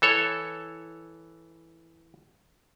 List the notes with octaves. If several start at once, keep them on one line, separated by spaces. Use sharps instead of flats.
E3 A4 C#5